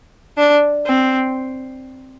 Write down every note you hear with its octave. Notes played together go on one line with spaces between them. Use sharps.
D4
C4